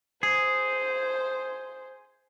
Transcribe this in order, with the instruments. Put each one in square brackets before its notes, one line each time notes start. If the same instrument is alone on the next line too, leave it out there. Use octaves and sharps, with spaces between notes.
[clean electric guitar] G#4 [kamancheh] C5